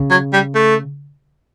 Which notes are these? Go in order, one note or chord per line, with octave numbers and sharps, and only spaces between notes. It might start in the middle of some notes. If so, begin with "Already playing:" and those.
Already playing: C#3
F#3
G3
A3